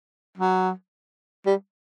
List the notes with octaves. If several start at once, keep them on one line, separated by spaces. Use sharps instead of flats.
F#3
G3